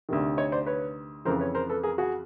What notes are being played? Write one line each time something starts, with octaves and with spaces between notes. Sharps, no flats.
D2 C3 D#3
C#5 D#5
C5 D5
B4 C#5
F2 C#3 E3 A#4 C5
B4 C#5
A#4 C5
A4 B4
G#4 A#4
F#4 G#4